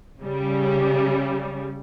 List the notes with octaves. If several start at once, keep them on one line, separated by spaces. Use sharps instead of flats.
C#3 G3